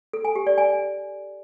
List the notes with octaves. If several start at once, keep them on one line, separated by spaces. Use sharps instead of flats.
A4
G#5
G4
D5
G#5